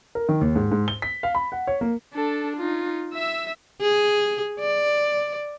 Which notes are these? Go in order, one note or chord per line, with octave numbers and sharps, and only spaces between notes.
A#4
D#3
D#2
G#2
G#2
G7
B6
F5
B5
F#5
C#5
A#3
D4 A4
D#4 F4
E5 E6
G#4
D5